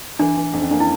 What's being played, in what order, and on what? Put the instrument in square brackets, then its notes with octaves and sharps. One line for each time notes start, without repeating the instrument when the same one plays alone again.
[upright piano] E3 [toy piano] D4
[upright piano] E3
[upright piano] F2 [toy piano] D4
[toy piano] C#4
[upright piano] A#3 [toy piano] D4
[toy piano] E4